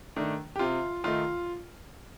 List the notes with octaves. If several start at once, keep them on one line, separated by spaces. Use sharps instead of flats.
D#3 A3 D4
G4
C3 F4
D#3 A3 D#4 F4